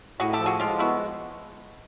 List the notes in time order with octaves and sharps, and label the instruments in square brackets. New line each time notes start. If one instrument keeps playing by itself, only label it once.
[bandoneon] A2 [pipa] F#4 G#4
[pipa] G4 A4
[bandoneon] F3
[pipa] F#4 G#4
[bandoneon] G#3 [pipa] F4 G4
[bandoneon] B3 [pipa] E4 F#4